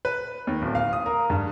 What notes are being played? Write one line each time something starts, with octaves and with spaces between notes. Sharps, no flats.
B4
D#2
D1
F5
D#6
A#4
G2